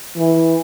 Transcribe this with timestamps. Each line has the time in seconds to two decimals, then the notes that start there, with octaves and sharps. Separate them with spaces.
0.17 E3